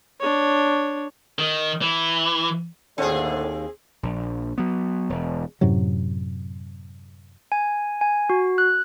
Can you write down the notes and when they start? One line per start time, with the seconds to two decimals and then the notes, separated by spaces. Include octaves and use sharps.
0.20 D4 C#5
1.39 D#3
1.82 E3
2.98 D#2 A2 D3 C4 G#4
4.03 A#1
4.58 F#3 B3
5.09 E1
5.61 F#2 A2 C3 F#3
7.52 G#5
8.01 G#5
8.30 F#4
8.58 F#6